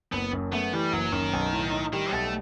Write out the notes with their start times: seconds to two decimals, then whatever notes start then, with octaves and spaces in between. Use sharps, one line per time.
0.12 F#1 B3
0.33 F#2
0.52 A3 B3
0.73 E3 G3
0.93 F#1 F#3
1.12 F#2 D#3
1.33 B1
1.53 A2
1.72 D#4
1.93 D#3 G3
2.12 B1 A3